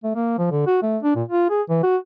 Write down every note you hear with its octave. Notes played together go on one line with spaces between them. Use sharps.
A3
A#3
F3
D3
F#4
A3
D4
A#2
F4
G#4
E3
F#4